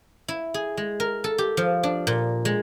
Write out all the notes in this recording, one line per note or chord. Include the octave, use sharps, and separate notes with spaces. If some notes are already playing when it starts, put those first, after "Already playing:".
E4
G#4
G#3
A#4
A4
G4
F3
D4
A#2
G#3